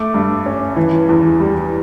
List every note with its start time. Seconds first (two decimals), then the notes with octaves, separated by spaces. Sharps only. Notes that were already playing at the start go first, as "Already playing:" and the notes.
Already playing: A3 D6
0.14 G2
0.46 C#4
0.76 E3
1.09 E2
1.40 G3